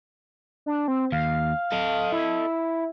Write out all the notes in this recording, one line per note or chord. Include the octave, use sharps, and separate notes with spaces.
D4
C4
D#2 F5
A4 D#5
E4